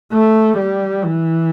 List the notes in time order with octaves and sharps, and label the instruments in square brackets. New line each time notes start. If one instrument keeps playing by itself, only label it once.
[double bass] A3
G3
E3